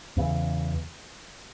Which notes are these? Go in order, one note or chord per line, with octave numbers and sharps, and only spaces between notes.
E2 C#3 E3